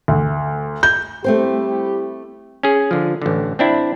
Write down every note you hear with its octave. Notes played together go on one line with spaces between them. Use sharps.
D2
G6
G3 A3 C4 E4 G4 C5
C#4 G#4
D3 F3
A1 D3
C4 D4 E4